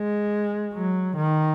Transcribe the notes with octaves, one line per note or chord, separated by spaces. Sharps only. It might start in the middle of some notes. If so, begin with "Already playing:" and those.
Already playing: G#3
F#3
D#3